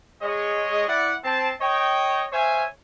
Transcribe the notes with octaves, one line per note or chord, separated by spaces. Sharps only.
G#3 C#5 D#5
E4 D5 F#5
C4 A5
C#5 D#5 G5
C5 C#5 E5 F5 G#5